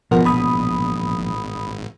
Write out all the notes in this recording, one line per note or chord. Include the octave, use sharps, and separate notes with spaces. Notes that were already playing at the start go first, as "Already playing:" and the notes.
G#1 B2 F3 A#4 F#5
A#1 B5 D#6